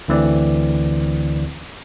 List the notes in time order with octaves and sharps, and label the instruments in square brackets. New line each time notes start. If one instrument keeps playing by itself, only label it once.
[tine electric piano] D2 D3 E3 C4 D5